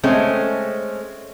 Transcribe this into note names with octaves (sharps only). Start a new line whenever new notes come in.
G#3 A3 C4 C#4